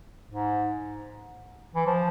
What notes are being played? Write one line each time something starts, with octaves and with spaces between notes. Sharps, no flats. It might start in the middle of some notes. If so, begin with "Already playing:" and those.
G#2
E3
F3